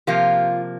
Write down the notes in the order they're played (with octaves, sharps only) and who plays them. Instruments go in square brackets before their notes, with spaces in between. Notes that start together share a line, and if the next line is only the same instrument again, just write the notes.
[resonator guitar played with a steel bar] C3 F3 A#3 F4 G4